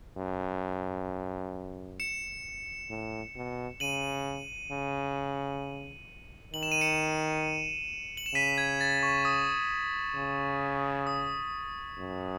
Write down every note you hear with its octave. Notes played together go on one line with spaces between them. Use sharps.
F#2
C#7 E7
A2
B2
C#3 D#7 F#7
C#3
D#3 F#7
E7
D#7
C#7 E7
F#7
E7
C#3 B6 D#7
G#6
A6
C#6
D#6
C#3
D#6
F#2